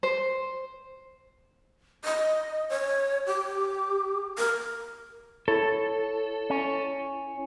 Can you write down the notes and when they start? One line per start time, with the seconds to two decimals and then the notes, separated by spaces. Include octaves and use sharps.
0.03 C5
2.05 D#5
2.69 C#5
3.27 G4
4.38 A#4
5.48 E4 A4 C#5
6.50 C#4